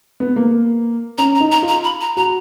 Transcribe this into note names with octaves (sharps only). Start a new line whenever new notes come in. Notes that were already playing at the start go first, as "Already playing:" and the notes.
B3
A#3
C#4 A#5
A#5
D#4
A#5
F4
A#5
B5
A#5
F#4 A#5